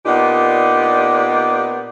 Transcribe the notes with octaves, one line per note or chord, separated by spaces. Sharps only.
A#2 B3 D4 D#4 G4